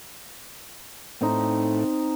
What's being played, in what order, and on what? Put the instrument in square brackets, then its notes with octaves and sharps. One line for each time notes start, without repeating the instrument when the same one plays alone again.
[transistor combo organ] A2 [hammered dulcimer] C4 D#4